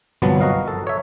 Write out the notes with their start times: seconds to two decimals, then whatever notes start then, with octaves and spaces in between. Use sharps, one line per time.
0.22 G1 C2 F3 F#3 B3 A5
0.41 F#4 A#4 D#5 F5
0.68 A4
0.87 C#5 E5